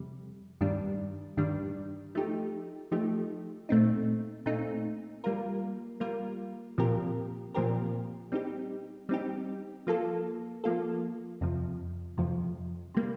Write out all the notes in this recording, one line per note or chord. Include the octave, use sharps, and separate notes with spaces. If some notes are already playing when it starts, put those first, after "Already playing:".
Already playing: F2 C3 G3
G2 D#3 G3 D4
G2 D#3 G3 D4
F3 A3 D#4 G4
F3 A3 D#4 G4
A#2 A3 C4 D#4
A#2 A3 C4 D#4
G3 A#3 F4 A#4
G3 A#3 F4 A#4
A#2 F3 C4 G4 A#4
A#2 F3 C4 G4 A#4
G3 C4 D#4 G4
G3 C4 D#4 G4
F3 A#3 F4 A4
F3 A#3 F4 A4
F2 C3 F3
F2 C3 F3
C3 G3 A#3